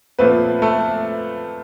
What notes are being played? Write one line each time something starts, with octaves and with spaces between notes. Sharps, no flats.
A#2 F3 A3 B3 C4 B4
A3 A4